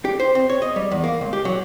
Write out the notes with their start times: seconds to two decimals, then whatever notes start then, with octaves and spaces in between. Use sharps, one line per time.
0.05 G4
0.20 C5
0.35 C4
0.50 C#5
0.62 D#5
0.76 G3
0.91 E2
1.04 A#3
1.21 C#2
1.33 G4
1.45 F#3